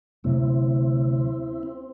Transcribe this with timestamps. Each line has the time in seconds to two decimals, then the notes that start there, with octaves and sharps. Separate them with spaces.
0.24 D2 C3 F#3 A3 C4 E4
1.63 C4